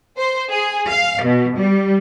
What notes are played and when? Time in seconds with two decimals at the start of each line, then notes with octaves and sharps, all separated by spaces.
0.18 C5
0.51 G#4
0.88 F5
1.22 B2
1.57 G3